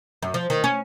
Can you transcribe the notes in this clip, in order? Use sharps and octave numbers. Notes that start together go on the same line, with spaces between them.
F#2
F3
D#3
C#4